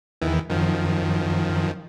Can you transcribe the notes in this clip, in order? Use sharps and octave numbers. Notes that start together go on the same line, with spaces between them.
E2 D#3 E3
F#2 D#3 F3